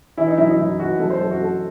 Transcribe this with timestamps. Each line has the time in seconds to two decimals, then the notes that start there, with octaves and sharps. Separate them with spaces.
0.17 E3 E4
0.28 D#4
0.37 F#2 E4
0.48 D#4
0.58 F#2 E4
0.80 E3 F#4
0.99 F#2 A4
1.10 C5
1.20 F#2 A4
1.31 F#4
1.41 F#2 A4